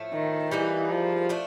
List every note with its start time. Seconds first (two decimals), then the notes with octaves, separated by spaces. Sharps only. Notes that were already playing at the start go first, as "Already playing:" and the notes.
Already playing: A2 F3 A3
0.13 D#3
0.51 E3 G3 A#3 D#4 G#4
0.90 F3
1.29 F3 A3 D4